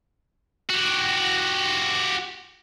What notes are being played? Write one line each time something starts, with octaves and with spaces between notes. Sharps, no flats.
F#4 G4